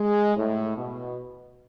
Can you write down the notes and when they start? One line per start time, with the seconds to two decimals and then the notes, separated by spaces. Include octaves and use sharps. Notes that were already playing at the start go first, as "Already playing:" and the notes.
Already playing: G#3
0.36 A2
0.77 B2